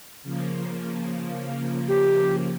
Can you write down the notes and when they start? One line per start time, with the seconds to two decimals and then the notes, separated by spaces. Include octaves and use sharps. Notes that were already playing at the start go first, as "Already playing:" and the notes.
0.23 C#3 F3 A#3
1.88 G4